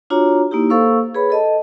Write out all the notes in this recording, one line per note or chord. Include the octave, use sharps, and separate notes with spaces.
D4 F4 F#4 C#5 A#5
A#3 D#4 E4 G4
A#3 A4 C5 F5 C#6 E6
G#4 B4 C#5 B5
A4 D#5 A5